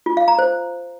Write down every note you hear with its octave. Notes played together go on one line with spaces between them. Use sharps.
F4
F5
A#5
C5